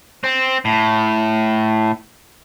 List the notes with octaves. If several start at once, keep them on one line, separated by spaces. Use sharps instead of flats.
C4
A2